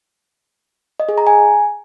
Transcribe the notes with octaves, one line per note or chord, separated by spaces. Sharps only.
D#5
G#4
A#5
G#5